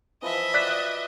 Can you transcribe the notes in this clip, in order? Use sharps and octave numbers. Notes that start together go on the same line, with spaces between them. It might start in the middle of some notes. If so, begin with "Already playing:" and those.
E3 F3 B4 D#5 E5
F#4 D5 F#6 B6